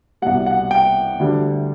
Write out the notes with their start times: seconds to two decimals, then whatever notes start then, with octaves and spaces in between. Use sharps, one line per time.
0.22 C2 B2 G3 F#5
0.46 F#5
0.71 G5
1.19 D2 D3 G3